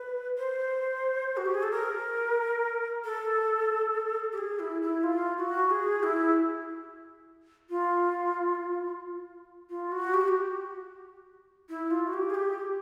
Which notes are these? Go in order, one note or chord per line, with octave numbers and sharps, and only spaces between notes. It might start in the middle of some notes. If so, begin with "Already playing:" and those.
Already playing: B4
C5
F#4
G4
G#4
A4
A#4
A4
G4
G#4
E4
E4
F4
F#4
G#4
E4
F4
F4
F#4
G4
F#4
G4
E4
F4
F#4
G4
G#4
G4